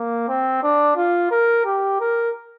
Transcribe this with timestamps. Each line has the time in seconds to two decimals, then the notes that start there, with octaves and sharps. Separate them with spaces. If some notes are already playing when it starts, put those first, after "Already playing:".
Already playing: A#3
0.28 C4
0.63 D4
0.96 F4
1.31 A#4
1.65 G4
2.00 A#4